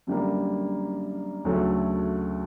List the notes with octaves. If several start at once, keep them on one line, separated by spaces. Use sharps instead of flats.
F#2 D3 G3 A#3
D2 C#3 F#3 A3